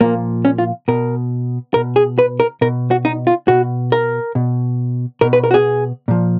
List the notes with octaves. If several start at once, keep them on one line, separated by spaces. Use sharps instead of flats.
A#2 F3 A#3
C#4
F4
B2 A#4
B2 A#4
G#4
B4
A#4
B2 A#4
F#4
D#4
F4
B2 F#4
A#4
B2
B2 A#4
B4
A#4
F#4
G#4
A#2 F3